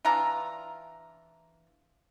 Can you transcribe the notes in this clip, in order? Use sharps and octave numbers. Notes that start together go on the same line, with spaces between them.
E3 D4 F4 A#5